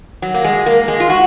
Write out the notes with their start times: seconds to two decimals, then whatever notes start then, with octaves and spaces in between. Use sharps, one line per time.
0.22 F#3
0.34 A#3
0.44 G#3
0.66 A#3
0.88 G#3
1.00 F4
1.10 F#4